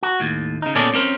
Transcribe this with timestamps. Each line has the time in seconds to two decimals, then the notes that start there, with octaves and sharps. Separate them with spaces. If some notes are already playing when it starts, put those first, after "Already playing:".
0.03 F#4
0.20 D#2 A2
0.62 C#3 D#4
0.75 A#2 B3 C#4 G#4 A4 D5
0.94 C4 C#4 A#4 C5